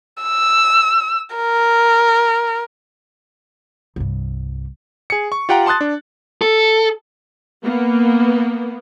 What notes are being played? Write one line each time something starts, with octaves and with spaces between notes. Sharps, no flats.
E6
A#4
C2 G2
G#4 C#7
C#6
F4 G4 F#5 G5 A#5
A5 C6 D#6 F#6 A6
D4
A4
A#3 B3